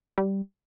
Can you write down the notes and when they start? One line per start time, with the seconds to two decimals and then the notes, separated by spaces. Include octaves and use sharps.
0.18 G3